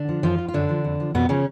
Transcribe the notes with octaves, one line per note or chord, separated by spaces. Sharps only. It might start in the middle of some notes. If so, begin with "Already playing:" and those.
Already playing: D3 D4
F3
F#2 F3 F4
F3
F4
F#2 D3 D4
F3
F2
F3
F2 B2 B3
C#3 F3 C#4